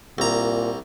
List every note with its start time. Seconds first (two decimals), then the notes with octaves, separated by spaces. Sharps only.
0.18 C2 A#2 A#5